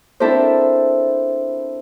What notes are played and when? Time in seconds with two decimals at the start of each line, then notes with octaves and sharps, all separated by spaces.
0.20 C4 D4 E4 A4 A#4 C5